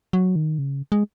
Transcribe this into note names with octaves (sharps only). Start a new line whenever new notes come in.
F#3
D#3
C#3
G#3